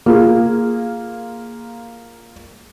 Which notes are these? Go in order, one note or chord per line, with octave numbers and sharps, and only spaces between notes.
A#3 F4 G#4